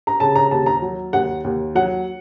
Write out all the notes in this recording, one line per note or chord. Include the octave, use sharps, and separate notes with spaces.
A#5
C#3 A5
A#5
D#2 A5
A#5
F#3
D#2 F#5
D#2
F#3 F#5